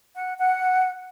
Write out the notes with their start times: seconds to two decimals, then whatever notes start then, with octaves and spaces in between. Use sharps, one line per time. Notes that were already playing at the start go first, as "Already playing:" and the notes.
0.16 F#5
0.39 F#5